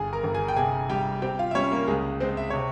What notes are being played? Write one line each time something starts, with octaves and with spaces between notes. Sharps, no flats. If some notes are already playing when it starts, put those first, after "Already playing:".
Already playing: G1 G#4 G#5
A#4 A#5
G1
G#4 G#5
G5
C3 G#4 G#5
G3 G4 G5
C4 G4 G5
F4 F5
E5
G3 C#4 C#5
A#3 A#4
C#2 G#3 G#4
G#3 C4 C5
E5
C3 C#5